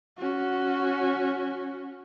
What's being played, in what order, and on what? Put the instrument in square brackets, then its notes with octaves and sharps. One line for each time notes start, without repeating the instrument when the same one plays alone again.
[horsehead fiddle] C#4 F#4